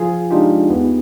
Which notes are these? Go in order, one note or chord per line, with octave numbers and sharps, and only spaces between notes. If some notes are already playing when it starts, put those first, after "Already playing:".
Already playing: F3 F4 G#4
G#3 D4 D#4 F4 G4
D#2 B3